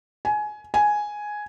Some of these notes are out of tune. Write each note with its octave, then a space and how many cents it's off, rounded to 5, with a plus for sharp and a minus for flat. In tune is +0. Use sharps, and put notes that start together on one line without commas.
G#5 +20
G#5 +5